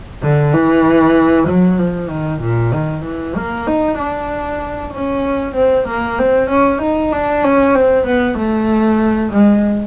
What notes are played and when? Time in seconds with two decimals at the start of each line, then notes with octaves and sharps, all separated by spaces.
0.22 D3
0.53 E3
1.48 F#3
1.79 F3
2.10 D#3
2.41 A#2
2.72 D#3
3.05 E3
3.36 A#3
3.67 D#4
3.99 D4
4.93 C#4
5.55 C4
5.87 A#3
6.19 C4
6.50 C#4
6.81 D#4
7.12 D4
7.44 C#4
7.74 C4
8.06 B3
8.37 A3
9.32 G#3